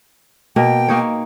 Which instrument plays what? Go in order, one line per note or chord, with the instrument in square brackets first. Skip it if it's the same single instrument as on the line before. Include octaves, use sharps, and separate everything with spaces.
[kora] B2 A#3 A#4 [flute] G5
[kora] A#3 D#4 C#5